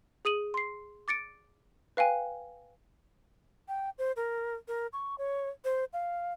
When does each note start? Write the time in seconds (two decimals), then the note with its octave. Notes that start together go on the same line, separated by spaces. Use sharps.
0.25 G#4 D#6 D#7 F#7
0.54 C6 C7
1.08 D6 A6 C#7 D7
1.97 B4 F5 G5 G#5
3.68 G5
3.98 C5
4.16 A#4
4.68 A#4
4.93 C#6
5.18 C#5
5.65 C5
5.93 F5